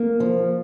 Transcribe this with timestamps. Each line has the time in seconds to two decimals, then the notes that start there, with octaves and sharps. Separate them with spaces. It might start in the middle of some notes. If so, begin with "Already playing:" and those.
Already playing: A#3
0.20 F3